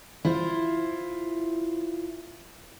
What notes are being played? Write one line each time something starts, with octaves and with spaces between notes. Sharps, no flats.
E4 F4 C5